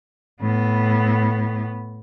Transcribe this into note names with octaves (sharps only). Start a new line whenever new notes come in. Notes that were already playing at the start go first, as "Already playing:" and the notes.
A2 B3